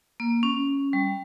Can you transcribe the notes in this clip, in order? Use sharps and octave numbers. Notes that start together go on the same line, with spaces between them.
A#3
C#4
G3